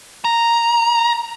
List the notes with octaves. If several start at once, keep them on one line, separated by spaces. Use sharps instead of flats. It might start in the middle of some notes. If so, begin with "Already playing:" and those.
A#5